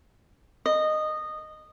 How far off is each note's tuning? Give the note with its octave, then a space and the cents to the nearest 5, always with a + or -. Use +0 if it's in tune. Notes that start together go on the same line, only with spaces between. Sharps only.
D#5 -15